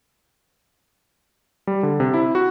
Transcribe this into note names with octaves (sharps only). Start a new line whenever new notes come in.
G3
D3
C3
E4
F#4